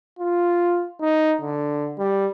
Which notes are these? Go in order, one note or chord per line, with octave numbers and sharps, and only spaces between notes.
F4
D#4
D3
G3